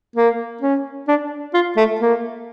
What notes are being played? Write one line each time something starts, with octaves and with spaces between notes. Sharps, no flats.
A#3
C#4
D4
F4
A3
A#3